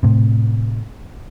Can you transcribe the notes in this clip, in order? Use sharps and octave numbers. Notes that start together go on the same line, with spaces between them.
A2 C3